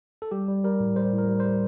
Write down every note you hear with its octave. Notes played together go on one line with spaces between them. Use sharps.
A4
G3 G4
G3
G3 A#4
A2
G3 C5
A2
A#4
G3
C5
G3